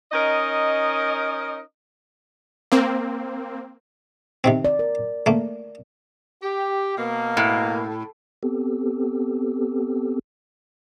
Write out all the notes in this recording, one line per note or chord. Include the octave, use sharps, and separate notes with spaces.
C#4 D#4 A#4 D#5
A#3 C4
C3 D#3 C4
D5
A#4
A3 A#3
G4
B2 A#3
A2
B3 C4 G4 A4